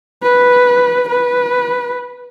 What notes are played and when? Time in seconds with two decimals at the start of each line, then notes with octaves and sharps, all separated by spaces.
0.23 B4
1.09 B4